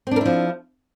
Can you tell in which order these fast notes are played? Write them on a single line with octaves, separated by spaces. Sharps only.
C4 D4 A#4 E4 F3